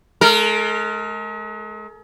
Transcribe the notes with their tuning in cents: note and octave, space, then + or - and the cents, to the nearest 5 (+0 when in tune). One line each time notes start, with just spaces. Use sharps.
G#3 +40 A#4 -25